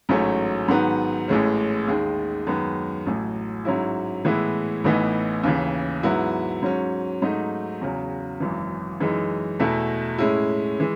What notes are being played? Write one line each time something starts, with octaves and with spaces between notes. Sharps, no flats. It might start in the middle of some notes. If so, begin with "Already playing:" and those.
A1 G#2 F#3 A3 C#4
G#2 D#3 F#3 B3
A1 A2 E3 G#3 C#4
D#2 D#3 G#3
F#2 D#3 G#3 B3
A1 A2 F#3
G#2 F#3 C#4 E4
A2 E3 G#3 B3 E4
A1 A2 E3 B3 D#4
D#2 C#3 E3
G#2 F#3 B3 E4
G#2 F#3 C#4
G#2 F#3 A3 D#4
E2 C#3 F#3
G#1 F#2 E3
F#2 E3 G#3 D#4
E2 B2 A3 E4
A2 G#3 C#4 E4
E3 G#3